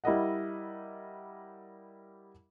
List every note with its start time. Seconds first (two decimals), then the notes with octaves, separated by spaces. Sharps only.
0.04 G3 E4 A#4 D#5 F#5